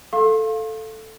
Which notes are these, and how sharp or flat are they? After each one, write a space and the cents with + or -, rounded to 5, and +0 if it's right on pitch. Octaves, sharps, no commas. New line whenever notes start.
A4 +0 F5 +0 C6 +45